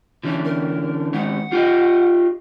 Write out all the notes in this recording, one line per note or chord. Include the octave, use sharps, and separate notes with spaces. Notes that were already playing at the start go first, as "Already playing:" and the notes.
D3 E3 C#4
A#4
D#3 G#3 C#4 F#5
F4 G4 D#5